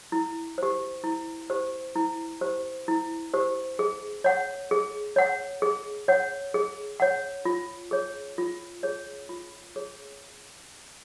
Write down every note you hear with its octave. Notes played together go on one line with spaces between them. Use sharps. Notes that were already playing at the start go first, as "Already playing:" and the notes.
E4
G4 C5
E4
G4 C5
E4
G4 C5
E4
G4 C5
G#4
C#5 F#5
G#4
C#5 F#5
G#4
C#5 F#5
G#4
C#5 F#5
F4
G#4 C#5
F4
G#4 C#5
F4
G#4 C#5